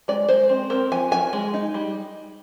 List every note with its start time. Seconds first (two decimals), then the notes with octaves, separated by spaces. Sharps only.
0.08 G#3 D5
0.29 G#3 C5
0.49 C4
0.70 C4 A#4
0.92 F3 G#5
1.11 F3 G#5
1.33 G#3
1.54 D#4
1.74 G3